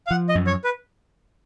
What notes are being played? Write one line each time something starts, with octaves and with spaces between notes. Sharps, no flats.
F5
F3 F#5
D#5
F#2
C#5
B4